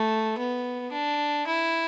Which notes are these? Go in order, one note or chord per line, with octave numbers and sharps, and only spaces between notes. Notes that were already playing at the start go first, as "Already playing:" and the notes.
Already playing: A3
B3
D4
E4